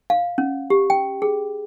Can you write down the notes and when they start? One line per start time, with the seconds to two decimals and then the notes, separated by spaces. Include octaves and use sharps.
0.10 F5
0.38 C#4
0.70 G4
0.90 G5
1.22 G#4